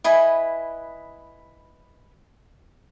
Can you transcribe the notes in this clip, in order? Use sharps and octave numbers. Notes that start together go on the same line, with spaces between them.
E4 B4 D#5 G#5